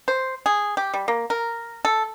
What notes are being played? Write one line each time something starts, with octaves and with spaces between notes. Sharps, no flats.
C5
G#4
G4
G3
A#3
A#4
A4